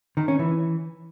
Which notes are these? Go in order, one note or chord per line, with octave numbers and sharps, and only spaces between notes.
D#3
C#4
E3